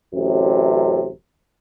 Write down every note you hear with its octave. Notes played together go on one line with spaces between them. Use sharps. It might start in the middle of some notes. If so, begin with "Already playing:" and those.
A1 F#2 C3